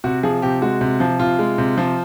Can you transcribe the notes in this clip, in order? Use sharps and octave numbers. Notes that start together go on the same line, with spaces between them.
C3 F#4
F3 G#4
C3 G4
G#3 F#4
C3
F3
C3 F4
G#3
C3
F3